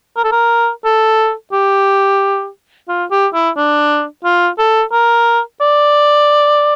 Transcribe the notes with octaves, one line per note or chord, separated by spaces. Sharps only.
A#4
A4
A#4
A4
G4
F4
G4
E4
D4
F4
A4
A#4
D5